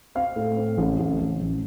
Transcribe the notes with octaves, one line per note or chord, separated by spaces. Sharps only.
C4 F5
A2
C4
A1
A1
A1
A1